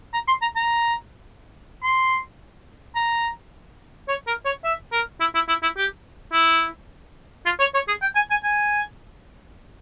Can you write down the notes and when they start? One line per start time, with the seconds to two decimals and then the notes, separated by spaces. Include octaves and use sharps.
0.14 A#5
0.28 C6
0.42 A#5
0.56 A#5
1.83 C6
2.95 A#5
4.08 C#5
4.27 A#4
4.45 C#5
4.64 E5
4.92 A#4
5.20 E4
5.35 E4
5.48 E4
5.62 E4
5.77 G4
6.32 E4
7.45 F4
7.59 C#5
7.74 C#5
7.88 G#4
8.02 G5
8.15 G#5
8.30 G#5
8.43 G#5